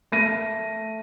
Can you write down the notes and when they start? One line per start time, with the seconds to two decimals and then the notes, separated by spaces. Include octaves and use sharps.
0.12 A3 A#6 D#7